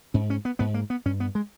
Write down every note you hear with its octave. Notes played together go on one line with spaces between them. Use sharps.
G#2 C#4
C#4
B3
G#2 B3
A#3
B3
G2 C#4
B3
G#3